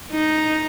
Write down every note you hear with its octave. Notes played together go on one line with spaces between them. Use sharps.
D#4